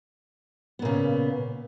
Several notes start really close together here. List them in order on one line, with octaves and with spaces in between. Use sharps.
B3 A#2 C#3